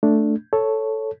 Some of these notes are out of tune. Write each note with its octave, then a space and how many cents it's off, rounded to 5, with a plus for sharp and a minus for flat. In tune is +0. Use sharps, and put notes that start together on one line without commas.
A3 +5 D4 +0
A4 +0 C#5 +0